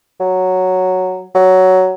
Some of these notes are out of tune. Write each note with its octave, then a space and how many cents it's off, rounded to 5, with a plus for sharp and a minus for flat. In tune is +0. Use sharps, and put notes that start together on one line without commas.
F#3 +0
F#3 +10